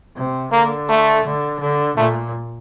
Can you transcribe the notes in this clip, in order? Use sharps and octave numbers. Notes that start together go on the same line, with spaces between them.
C3
D3 A#3
A3
D3
D3
A#2 A3